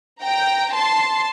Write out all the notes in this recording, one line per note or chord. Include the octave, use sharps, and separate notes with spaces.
G5 A#5
A5 C6